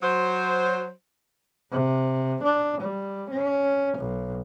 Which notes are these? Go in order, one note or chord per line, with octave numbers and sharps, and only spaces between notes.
F#3 C5
C3
D4
G3
C#4
B1